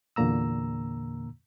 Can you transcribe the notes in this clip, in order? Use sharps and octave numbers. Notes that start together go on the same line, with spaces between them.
E2 A#2 D3 A#3 A#5 E6